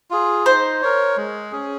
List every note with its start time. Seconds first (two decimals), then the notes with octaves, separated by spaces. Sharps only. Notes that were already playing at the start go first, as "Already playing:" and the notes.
0.11 F4 G#4
0.46 D#4 C5
0.82 A#4 C#5
1.17 G#3
1.52 C#4 G#4